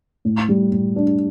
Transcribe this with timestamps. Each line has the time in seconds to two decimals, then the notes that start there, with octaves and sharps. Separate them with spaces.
0.25 A2
0.49 G3
0.72 A2
0.96 D4